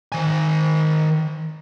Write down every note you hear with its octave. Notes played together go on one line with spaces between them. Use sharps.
D#3 G#5